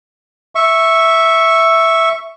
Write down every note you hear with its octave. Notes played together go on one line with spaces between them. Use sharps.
E5 C#6